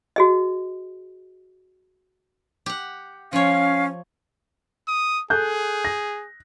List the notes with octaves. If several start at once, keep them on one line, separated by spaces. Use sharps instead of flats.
F#4 G#4 D#5
G4 F#5
F3 C#4 C#5 F5
D#6
G#4 A4 F#6 G6
A#6